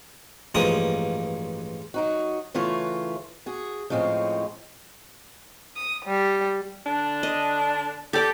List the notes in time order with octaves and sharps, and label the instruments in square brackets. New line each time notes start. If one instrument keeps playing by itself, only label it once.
[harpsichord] A1 G2 F3 G#3 A#3 D#6
[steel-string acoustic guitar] F#3 D#4 F#4
C#3 E3 A3 F4 C#5
F#4 G#4
A2 F3 G#3 C4 C#4
[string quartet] D#6
G3
[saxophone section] D3 D4
[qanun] D#5
[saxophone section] G4 [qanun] A4 D5